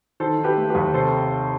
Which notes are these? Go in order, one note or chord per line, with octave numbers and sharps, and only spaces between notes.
D#3 A4 C5
D#3
G4 B4
A3
G4 B4
D#2
C3 A4 C5